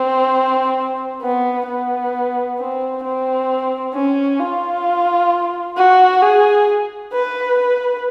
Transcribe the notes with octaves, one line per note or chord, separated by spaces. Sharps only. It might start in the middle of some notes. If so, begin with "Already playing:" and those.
Already playing: C4
B3
B3
C4
C4
C#4
F4
F#4
G#4
B4
B4